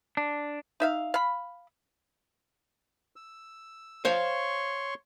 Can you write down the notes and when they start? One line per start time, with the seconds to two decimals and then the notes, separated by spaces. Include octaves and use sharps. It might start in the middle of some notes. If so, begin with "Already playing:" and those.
0.17 D4
0.80 D#4 E5 F5
1.14 F5 B5
3.16 E6
4.05 C5 C#5 F5 C6 C#6